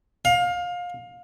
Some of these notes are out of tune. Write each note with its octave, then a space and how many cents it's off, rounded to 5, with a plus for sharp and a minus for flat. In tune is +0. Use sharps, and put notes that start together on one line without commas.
F5 +25